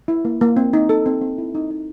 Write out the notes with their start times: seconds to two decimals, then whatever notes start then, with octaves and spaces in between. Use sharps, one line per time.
0.08 E4
0.25 A#3
0.41 A#3
0.57 C4
0.73 D#4
0.89 A4
1.06 C4
1.21 C4
1.38 E4
1.55 D#4
1.71 D#4